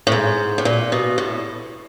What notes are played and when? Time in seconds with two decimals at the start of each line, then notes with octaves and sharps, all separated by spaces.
0.07 A2
0.12 G#2
0.58 A2
0.65 A#2
0.92 B2
1.18 A2